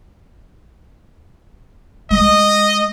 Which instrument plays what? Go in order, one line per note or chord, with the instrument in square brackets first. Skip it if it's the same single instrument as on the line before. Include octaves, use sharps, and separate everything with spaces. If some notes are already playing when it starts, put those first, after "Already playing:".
[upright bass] G#3 [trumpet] D#5